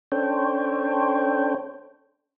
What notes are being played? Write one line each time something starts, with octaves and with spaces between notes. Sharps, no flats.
C#4 D4 A4 C5 C#5 G5